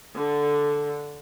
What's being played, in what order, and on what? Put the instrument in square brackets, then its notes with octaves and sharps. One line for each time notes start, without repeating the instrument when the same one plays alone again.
[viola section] D3